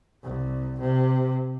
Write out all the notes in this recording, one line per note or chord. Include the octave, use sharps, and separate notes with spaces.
C2
C3